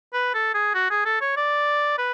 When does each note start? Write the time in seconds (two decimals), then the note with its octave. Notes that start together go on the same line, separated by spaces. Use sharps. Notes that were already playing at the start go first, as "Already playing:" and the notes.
0.13 B4
0.34 A4
0.54 G#4
0.74 F#4
0.90 G#4
1.05 A4
1.21 C#5
1.36 D5
1.98 B4